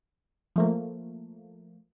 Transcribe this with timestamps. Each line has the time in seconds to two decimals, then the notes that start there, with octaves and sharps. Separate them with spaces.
0.56 F3 A3 A#3